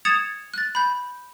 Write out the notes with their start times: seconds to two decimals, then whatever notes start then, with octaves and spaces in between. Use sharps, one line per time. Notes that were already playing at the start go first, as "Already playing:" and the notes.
0.05 D#6 G#6 A6 C#7 E7 F7
0.54 F#6 A6
0.75 B5 G6